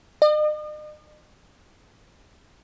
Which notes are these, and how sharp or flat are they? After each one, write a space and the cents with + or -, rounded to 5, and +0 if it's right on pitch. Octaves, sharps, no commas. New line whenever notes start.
D#5 -45